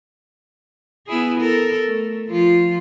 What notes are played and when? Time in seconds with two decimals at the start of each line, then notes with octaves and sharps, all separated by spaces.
1.07 B3 E4 G#4
1.39 A4 A#4
1.87 A3
2.29 F3 F4